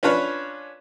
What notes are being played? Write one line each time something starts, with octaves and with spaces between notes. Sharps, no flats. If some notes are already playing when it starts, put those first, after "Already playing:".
C#4 D4 F4 B4 C#5